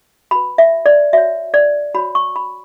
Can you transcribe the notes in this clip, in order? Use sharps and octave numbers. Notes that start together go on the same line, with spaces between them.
F#4 B4 B5
E5
D5
F#4 C#5 E5
D5
F#4 C#5 B5
C#6
B5